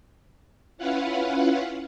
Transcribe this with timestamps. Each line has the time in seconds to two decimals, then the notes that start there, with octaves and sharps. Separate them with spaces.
0.78 C#4 E4 F4 B4 F5 F#5